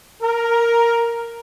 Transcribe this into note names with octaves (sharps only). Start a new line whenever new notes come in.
A#4